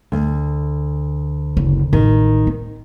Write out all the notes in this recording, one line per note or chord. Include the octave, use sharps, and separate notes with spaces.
D2
F#1
A1 D#3
C4